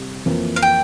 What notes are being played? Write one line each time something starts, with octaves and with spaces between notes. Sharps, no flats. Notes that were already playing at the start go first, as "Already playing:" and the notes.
Already playing: C3 G3
F2 E3 A#3
F5
G5